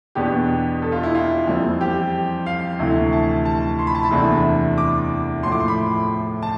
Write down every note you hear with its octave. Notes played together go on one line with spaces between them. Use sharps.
E2 B2 B3 D4 G4
A4
F4
E4
F4
F2 E3 G3 C4
G4
F5
D2 C3 E3 A3
A5
A5
C6
B5
A5
B5
E2 C3 E3 A3 D4
D6
A2 F3 A3 C6
D6
C6
B5
A5